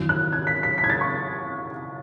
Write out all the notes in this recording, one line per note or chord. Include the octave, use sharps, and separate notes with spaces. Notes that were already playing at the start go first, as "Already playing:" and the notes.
Already playing: G#1 F#2 E3
F#6
G#6
B6
B6
B6
G#6
A6
C#6